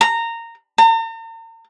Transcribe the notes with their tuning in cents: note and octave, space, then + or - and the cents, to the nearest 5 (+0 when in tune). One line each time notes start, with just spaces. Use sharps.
A#5 -15
A#5 -45